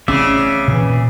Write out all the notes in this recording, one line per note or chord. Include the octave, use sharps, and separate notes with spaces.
A1 C#3 C4 C#4 D5 E5
A#2 E3